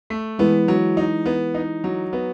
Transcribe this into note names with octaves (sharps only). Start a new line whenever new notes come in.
A3
E3 G#3 B3
F#3
D#4
B3
D#4
F#3
B3